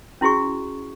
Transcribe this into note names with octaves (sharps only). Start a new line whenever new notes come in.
C#4 E4 F#4 G#4 C#6